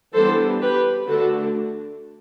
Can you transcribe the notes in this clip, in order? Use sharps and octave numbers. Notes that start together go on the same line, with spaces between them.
E3 G3 B3 D4 A4 C5
G4 B4
D3 A3 D4 F#4 A4